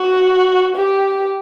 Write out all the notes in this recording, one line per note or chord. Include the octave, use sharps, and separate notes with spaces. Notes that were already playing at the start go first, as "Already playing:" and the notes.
Already playing: F#4
G4